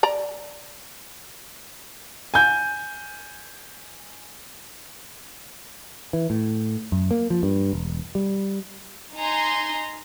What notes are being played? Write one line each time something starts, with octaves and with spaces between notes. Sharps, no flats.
D5 A#5
G#5 G6
E3
A2
F#2
A#3
F3
G2
E1
G3
D#4 G#5 A#5 C6